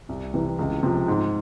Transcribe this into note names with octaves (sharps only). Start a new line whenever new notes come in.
C2
C3 E3
C#2
C3 F3
G#2